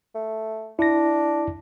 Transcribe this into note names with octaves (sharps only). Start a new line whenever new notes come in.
A3
D4 E4 A#6